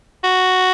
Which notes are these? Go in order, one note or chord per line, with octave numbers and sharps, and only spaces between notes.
F#4